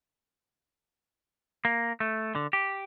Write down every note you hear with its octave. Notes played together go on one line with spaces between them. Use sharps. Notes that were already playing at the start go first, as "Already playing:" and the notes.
A#3
A3
D3
G4